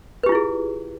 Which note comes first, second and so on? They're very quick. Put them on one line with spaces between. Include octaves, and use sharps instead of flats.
B4 G4 F4 E4 G#4